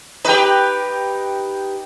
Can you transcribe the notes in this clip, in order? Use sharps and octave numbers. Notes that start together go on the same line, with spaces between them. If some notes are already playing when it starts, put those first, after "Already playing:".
D#4 G4 B4 G5